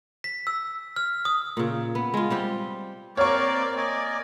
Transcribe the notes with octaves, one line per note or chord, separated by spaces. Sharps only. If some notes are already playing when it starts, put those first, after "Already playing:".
B6
E6
F6
D#6
A#2 C#3
B3
G#3 F4
G3 C4 G4
A#3 C4 A#4 C#5 D5 F5 C#6
A#3 D5 D#5 G#5